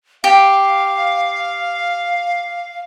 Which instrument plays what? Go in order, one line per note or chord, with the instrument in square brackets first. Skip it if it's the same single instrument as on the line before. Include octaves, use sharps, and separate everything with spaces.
[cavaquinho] G4 [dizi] F5